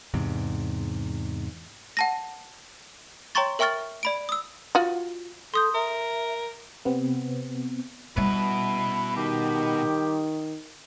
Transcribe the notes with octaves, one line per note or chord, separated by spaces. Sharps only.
E2 G#2 C3
F#5 A5 A#6
C#5 G5 A#5 C6 C#6 A6
A#4 E5 G5 C#6 F6 A6
D5 B5 D7
D#6 E6
F4 F#4
A4 C6 D#6 G6
A#4 E5
C3 B3 C4
B2 G3 C#4 E4 B4
D#3 G4